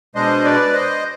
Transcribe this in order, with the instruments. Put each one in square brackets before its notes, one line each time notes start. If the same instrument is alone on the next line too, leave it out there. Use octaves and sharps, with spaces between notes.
[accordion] B2 G#3 D4 C5 D#5
B4 D5
C5 D#5